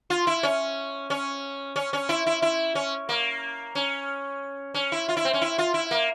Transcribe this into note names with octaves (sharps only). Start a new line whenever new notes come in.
F4
E4
C#4
C#4
C#4
C#4
E4
E4
E4
C#4
A#3
C#4
C#4
E4
F4
E4
C4
C#4
E4
F4
E4
A#3